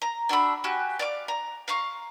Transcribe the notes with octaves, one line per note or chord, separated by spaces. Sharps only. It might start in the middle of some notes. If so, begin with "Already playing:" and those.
A#5
D4 F#4 E5 B5
F#4 G4 G#5 F#6
D5 F5 D6
A#5
F5 A#5 C6 C#6